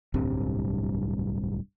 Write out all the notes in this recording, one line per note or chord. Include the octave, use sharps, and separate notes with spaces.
D1 C2 G2 C3